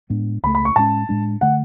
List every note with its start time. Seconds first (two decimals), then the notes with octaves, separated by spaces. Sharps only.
0.10 A2 G#3 B3 D4
0.43 C#2 C#3 F#3 A3 B5
0.55 B5
0.65 C#6
0.76 A2 G#3 C#4 A5
1.09 A2 G#3 D4
1.41 D3 A3 F#5